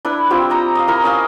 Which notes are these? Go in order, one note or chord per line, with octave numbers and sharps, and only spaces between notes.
D4 E4 B4
C4 E4 F4 G4
D#5 A#5 E6
D#5 F5
E4 A#4 D#5
C#4 D#5 F5